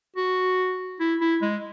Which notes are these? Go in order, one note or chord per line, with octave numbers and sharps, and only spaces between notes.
F#4
E4
E4
G#3